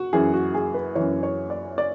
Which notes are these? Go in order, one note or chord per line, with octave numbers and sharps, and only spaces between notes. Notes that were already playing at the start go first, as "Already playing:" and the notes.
Already playing: F#4
F#2 E3 G#4
F#4
G#4
B4
F#2 E3 C#5
C#5
D5
D5